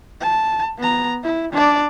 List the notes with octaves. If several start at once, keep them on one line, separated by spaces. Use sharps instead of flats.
A5
B3 A#5
E4
D4 D5